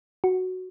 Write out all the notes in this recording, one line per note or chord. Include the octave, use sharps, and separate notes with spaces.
F#4